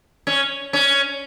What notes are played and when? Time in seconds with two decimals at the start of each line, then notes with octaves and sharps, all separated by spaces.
0.27 C#4
0.73 C#4